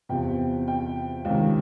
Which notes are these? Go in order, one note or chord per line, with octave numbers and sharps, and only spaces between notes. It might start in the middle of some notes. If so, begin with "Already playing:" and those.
E2 C3 F3 G5
G5
C#2 C3 D#3